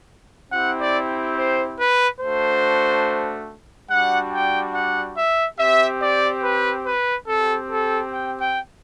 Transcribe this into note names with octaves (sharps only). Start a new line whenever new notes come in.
C4 E4 G4 F#5
D5
C5
B4
A3 D4 F#4 C5
G3 D4 F#4 F#5
G5
F#5
E5
C4 G4 E5
D5
B4
B4
C4 G4 A4
A4
G5
G5